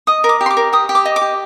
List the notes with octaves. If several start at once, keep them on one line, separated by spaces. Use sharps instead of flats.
D#5 D#6
A#4
D6
G4
C6
D6
A#4
G4 D#6
G4
D6
D#5
D6
G4